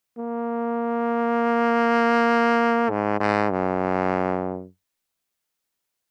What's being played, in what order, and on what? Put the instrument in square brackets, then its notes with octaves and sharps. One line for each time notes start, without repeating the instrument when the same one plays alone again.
[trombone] A#3
G#2
G#2
F#2